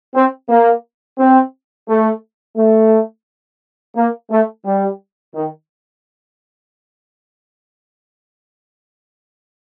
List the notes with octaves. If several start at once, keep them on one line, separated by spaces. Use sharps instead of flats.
C4
A#3
C4
A3
A3
A#3
A3
G3
D#3